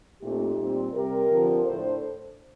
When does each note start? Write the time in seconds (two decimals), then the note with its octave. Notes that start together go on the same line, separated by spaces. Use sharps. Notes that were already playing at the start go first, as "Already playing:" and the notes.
0.22 A#2 A3 C4 D#4 G4
0.58 A#2 G3 C4
0.93 C3 G3 C4 G4 A#4
1.31 D3 F3 C4
1.66 A2 A3 D4 A4 C5